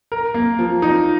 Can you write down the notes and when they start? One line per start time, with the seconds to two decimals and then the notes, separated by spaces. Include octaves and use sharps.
0.12 A#4
0.34 A#3
0.59 F3
0.82 D#4